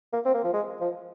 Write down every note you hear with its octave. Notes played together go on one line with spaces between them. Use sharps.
A#3
C4
A#3
F3
G#3
F3